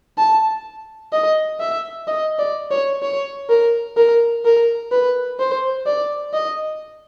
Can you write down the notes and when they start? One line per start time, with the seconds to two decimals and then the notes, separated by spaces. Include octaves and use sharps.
0.18 A5
1.13 D#5
1.60 E5
2.07 D#5
2.39 D5
2.71 C#5
3.03 C#5
3.49 A#4
3.97 A#4
4.45 A#4
4.92 B4
5.40 C5
5.87 D5
6.34 D#5